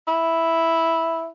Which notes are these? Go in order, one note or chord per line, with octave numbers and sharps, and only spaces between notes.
E4